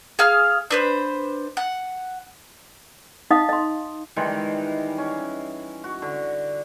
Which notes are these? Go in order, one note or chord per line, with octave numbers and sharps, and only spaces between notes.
G#4 F5 F6
D4 B4 C5
F#5
D#4 D#5 F5 D#6
D#5 C6
D#3 E3 G3 G#3
C#4
F#4
D3